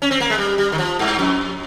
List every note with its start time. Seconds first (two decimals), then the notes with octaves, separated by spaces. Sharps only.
0.02 C#4
0.11 C4
0.20 A#3
0.30 G#3
0.38 G3
0.58 G3
0.72 D#3
0.78 F3
0.99 G2
1.19 F2